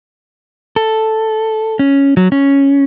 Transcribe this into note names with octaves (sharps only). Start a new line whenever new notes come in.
A4
C#4
F#3
C#4